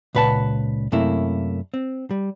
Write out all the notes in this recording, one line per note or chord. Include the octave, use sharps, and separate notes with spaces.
C#2 A#2 B4 F#5 A5
F#2 C3 A3 A#3 E4
C4
G3